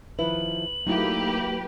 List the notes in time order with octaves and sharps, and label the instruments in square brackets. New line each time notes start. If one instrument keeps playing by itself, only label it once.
[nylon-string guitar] D#3 F3 E4 [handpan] B4 [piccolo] F#7
[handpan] F#3 A3 E4 [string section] A#3 G4 B4 [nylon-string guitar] D#4 F5